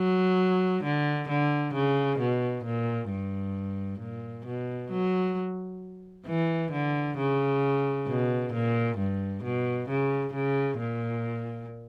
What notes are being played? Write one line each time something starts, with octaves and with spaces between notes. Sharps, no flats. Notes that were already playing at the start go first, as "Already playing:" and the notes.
Already playing: F#3
D3
D3
C#3
B2
A#2
G2
A#2
B2
F#3
E3
D3
C#3
B2
A#2
G2
B2
C#3
C#3
A#2